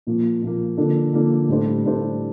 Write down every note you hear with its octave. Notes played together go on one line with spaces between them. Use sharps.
A#2 F3 A#3
A#2 F3 A#3
D3 F3 A#3 D4 A4
D3 F3 A#3 D4 A4
A2 G3 D4 A4 C5
A2 G3 D4 A4 C5